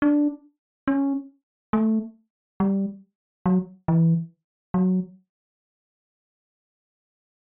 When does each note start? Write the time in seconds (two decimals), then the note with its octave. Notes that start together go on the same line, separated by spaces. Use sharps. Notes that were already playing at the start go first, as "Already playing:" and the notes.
0.02 D4
0.88 C#4
1.73 A3
2.60 G3
3.46 F#3
3.88 E3
4.74 F#3